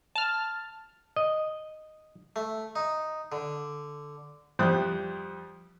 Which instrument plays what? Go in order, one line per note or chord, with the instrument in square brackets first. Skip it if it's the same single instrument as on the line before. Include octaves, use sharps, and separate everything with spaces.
[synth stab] A5 F6
[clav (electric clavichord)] D#5
[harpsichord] A3
D#4
D3
[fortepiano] F2 G3 E4 C5 D#6 F#6